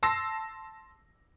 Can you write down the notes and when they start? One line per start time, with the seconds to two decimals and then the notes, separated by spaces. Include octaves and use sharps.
0.03 A5 C6 E6 A#6 C7